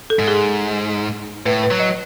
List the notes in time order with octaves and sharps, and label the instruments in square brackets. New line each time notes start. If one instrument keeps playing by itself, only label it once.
[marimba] A4
[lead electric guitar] G#2
[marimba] G#4
[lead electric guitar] A2 [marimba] B4
[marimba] B4
[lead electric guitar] F#3
[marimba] D#5